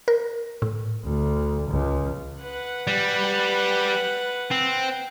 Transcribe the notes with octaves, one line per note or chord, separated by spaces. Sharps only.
A#4
A2
D2
C#2
B4 F#5
G3
C4